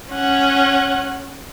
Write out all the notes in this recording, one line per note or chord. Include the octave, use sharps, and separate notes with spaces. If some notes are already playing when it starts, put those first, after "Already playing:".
C#4 F#5